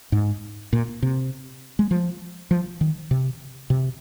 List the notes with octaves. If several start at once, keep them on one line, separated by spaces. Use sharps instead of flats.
G#2
A#2
C3
G#3
F3
F3
D#3
C3
C3